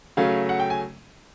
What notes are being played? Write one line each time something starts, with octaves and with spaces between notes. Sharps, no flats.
C#3 F#3 A3 C#4 F5
F#5
G5
G#5